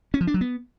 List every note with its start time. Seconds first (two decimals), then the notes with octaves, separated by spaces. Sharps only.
0.14 C#4
0.21 F3
0.27 D4
0.34 F#3
0.41 B3